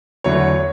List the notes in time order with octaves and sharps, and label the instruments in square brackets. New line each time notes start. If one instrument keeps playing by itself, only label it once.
[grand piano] E2 D3 F#3 A3 C#5